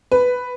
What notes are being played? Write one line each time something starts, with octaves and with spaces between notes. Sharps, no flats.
B4